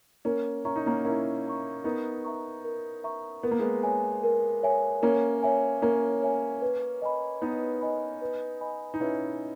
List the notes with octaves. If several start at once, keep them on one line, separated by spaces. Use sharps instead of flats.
A#3 C#4 A#4
C#4 E5 A#5 C#6
D#4
A#3 C#4
C#4 E4 A#4
E5 A#5 C#6
B3 D#4 A#4
E5 A#5 C#6
A#4
E5 A#5 C#6
B3 A#4
A#3
G#3 B3
C#5 E5 G#5
A#4
C#5 E5 G#5
A#3 C#4 A#4
C#5 E5 G#5
A#3 C#4 A#4
C#5 E5 G#5
B4
D#5 G#5 B5
B3 D#4 B4
D#5 G#5 B5
B4
D#5 G#5 B5
D#4
C#4 E4 B4